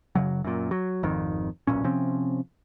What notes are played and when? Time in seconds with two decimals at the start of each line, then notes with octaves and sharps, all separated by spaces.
0.15 F#1 C#3 F#3
0.44 F#2 A#2
0.71 F#3
1.03 G#1 F2 D#3
1.67 D1 B1 A#2 C#4
1.84 C3 F3 C4 C#4